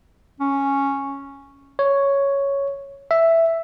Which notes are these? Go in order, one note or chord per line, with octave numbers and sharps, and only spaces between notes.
C#4
C#5
E5